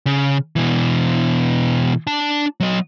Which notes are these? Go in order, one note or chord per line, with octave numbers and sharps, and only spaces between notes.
C#3
B2 E3
D4 A5
F#3 D#5